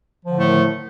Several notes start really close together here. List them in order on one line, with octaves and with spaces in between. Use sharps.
F3 D3 A2 A3 D#3